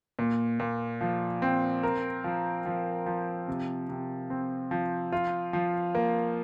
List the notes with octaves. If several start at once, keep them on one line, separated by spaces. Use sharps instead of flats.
A#2
A#2
F3
C4
A#4
F3
F3
F3
C3
C3
C4
F3
F4
F3
A#3